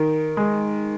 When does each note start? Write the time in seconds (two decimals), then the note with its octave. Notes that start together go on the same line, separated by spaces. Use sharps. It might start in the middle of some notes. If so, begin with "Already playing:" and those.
Already playing: D#3
0.37 G#3